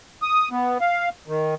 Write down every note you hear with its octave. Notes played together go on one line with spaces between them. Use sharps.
D#6
B3
F5
D#3